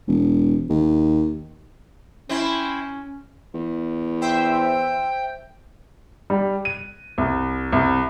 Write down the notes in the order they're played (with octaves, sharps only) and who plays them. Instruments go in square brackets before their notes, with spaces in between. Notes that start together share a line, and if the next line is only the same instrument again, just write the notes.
[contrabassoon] E1
D#2
[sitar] C4 E4 [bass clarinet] C#4
[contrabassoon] E2
[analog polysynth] C5 E5 [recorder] G5
[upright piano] G3
D#7
C2
C2